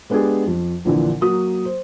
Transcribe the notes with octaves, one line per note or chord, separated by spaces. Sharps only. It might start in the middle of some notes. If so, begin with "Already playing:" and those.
G#3 B3 D4 G4 G#4
F2
A#1 A#2 D3 E3
F#3 A#3 F#4 D#6
C5